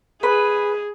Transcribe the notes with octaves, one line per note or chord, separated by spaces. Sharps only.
G#4 B4